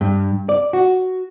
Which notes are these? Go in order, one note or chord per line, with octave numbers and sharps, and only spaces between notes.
G2
D5
F#4